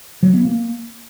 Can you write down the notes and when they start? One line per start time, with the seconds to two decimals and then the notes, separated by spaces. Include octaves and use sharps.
0.23 F#3
0.34 B3
0.45 A#3